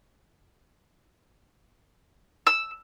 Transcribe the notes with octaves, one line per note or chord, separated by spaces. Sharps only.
E6